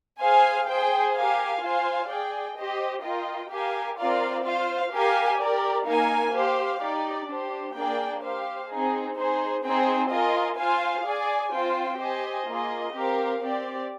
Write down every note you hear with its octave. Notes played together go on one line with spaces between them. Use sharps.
G#4 C5 F5 G#5
G#4 C5 G5
G4 A#4 F5 G#5
F4 C5 F5 G#5
G#4 D5 G5
G4 C5 D#5
F4 A#4 D#5 G5
G4 A#4 F5 G#5
C4 F4 A#4 D5 F5
F4 C5 F5
G4 A#4 F5 G#5
G4 A#4 D5
A#3 D#4 A#4 F5 G#5
G4 C5 F5
D#4 G4 D5
D4 G4 C5
A#3 D4 G#4 D5 G5
G4 C5 F5
C4 D#4 G#4
D#4 G#4 C5
C4 D#4 G#4 C5 G5
F4 A#4 D#5 G#5
F4 C5 F5 G#5
G#4 D5 G#5
C4 F4 C5 G5
G4 C5 D#5 G#5
A#3 F4 G#4 D#5
C4 G4 A#4 F5
C4 G4 D5